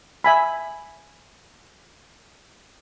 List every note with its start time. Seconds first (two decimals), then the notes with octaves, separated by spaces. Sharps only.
0.24 E5 G#5 B5